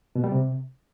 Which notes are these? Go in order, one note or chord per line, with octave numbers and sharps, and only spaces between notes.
B2
G3
C3